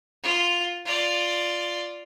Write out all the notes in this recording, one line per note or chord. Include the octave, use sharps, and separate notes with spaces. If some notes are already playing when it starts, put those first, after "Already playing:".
F4
F4 D5